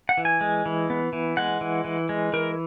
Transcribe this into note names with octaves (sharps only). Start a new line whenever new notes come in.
F#5
E3
G#5
G#3
E3
B3
E3
G#3 F#5
E3
E3
G#3
E3 A#4